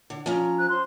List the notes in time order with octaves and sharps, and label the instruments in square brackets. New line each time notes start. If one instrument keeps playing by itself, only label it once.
[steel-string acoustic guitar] D3
F3 C#4 A#5
[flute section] C5 F#6
C5 C6